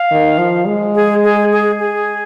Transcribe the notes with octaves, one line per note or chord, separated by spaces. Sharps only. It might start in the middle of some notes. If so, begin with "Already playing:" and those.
Already playing: F5
D#3
F3
G#3
G#4
G#4
G#4
G#4